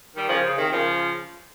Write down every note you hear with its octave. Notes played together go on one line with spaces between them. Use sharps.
D#3 G3
C#3 F3
C#3
C3 D#3
C#3 F3